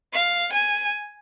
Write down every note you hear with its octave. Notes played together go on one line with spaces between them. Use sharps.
F5
G#5